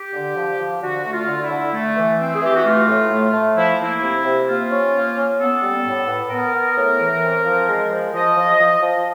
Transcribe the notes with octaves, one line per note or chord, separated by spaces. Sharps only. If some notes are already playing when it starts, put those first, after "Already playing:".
Already playing: G4
D3
F3
F3
D3 F#4
A3
F4
D3
E4
D3
A3
E3
C4
G#4
E3 G4
F#4
A3 F4
A2
A3
A3
F3 E4
A#3 E4
C3
C3
A#3 F4
C#4
A#3
C#4
B3 A4
G3
A2
B3
B3 A#4
B3
A2
E3
C4
F3
G#3
F3
F3 D#5
F3
F3
F3